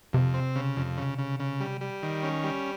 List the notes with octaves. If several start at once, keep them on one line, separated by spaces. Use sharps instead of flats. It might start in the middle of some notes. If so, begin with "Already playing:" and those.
F2 C3
C4
C#3
F2
C#3
C#3
C#3
G3
G3
D#3
C#4
G3